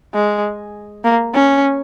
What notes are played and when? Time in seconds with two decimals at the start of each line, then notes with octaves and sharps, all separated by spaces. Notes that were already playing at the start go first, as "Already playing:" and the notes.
0.14 G#3
1.04 A#3
1.34 C#4